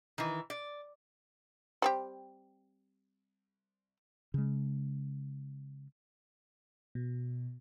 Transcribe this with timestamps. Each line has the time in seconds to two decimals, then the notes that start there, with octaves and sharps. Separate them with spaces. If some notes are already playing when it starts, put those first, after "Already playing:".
0.18 D#3 E3
0.50 D5
1.82 G3 C4 G4
4.34 C#3 G#3
6.95 B2